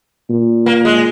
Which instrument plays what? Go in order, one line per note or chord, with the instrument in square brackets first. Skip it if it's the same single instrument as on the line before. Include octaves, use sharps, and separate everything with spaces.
[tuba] A#2
[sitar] A#3
G#3